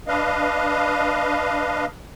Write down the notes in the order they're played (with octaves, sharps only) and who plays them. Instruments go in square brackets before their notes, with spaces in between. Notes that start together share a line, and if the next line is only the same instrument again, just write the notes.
[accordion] D4 B4 D#5 F5